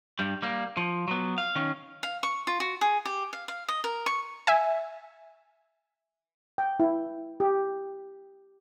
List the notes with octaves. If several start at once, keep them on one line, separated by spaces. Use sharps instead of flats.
G2 G3
G3 A#3
F3
F#3 B3
F5
D#3 C#4
F5
C#6
F4
F#4
G#4
G4
F5
F5
D#5
A#4
C#6
E5 G#5
G5
E4
G4